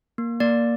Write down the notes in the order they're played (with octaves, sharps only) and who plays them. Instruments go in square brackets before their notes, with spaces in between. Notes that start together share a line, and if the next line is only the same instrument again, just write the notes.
[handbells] A#3
A#3 D5